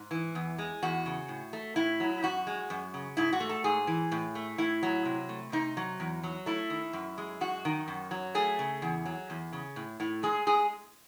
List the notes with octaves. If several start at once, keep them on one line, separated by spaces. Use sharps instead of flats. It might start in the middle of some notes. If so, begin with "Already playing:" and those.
Already playing: G#2
E3
E2
G#3
E2 F#4
C#3
A2
A3
A2 E4
F#3
F#2 F#4
G#3
F#2
C#3
G#2 E4
F#4
A3
A4
G#2 G#4
E3
A2
A3
A2 E4
F#3
C3
A3
C3 D#4
F#3
E2
F#3
A3 E4
D#3
F#2
G#3
F#2 F#4
D#3
F#2
F#3
A3 G#4
C#3
E2
F#3
E2
C#3
A2
A2
G#3 G#4
G#3 G#4